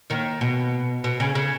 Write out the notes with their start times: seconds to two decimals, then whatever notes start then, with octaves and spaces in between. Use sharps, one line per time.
0.10 D#2 D#3
0.41 B2
1.04 B2
1.20 C#3
1.35 C#3